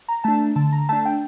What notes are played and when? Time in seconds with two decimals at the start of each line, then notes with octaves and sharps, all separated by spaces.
0.09 A#5
0.24 A3 D4 A5
0.56 D3 A5
0.73 A#5
0.89 A3 D4 A5
1.06 G5